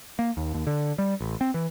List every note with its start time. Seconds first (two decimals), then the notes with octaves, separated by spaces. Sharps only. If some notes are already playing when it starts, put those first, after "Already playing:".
0.19 A#3
0.37 D#2
0.54 D#2
0.67 D3
0.98 G3
1.21 A1
1.41 C4
1.54 E3